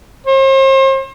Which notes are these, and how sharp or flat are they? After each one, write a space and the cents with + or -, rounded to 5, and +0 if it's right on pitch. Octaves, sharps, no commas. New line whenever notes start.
C5 +40